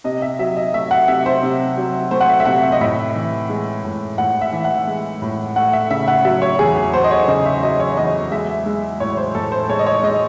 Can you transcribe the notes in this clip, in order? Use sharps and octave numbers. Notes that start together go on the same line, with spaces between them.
C3 D#5
E5
F#3 E5
D#5
A3 E5
F#5
C3 E5
C5
C3
F#3
A3 C5
F#5
E5
E5
C3 F#5
E5
D#5
A2 E5
E3
G#3
A2
A2 F#5
E5
E3
F#5
G#3
A2
A3 F#5
E5
C#3 E5
F#5
F#3 E5
C#5
E2 G#4
G#4
A3 C5
D#5
C#5
C#3 D#5
E5
F#3 D#5
C#5
E2 D#5
G#3 E5
G#3
A2 C#5
C5
A2 A4
C5
G#3 C#5
D#5
C#5
G#3 D#5